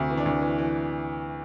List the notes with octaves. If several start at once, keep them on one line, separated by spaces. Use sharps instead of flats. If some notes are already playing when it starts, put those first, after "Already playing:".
Already playing: D2 C3
E3
D4
D2
E3
E3